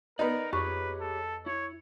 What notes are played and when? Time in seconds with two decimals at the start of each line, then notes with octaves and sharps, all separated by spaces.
0.19 B3 D#4 A#4 D5
0.53 F2 G4 G#4 B4 C#5 C#6
1.00 A4
1.46 E4 C#5